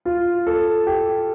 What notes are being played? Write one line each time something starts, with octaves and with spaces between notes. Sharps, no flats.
F4
A4
G4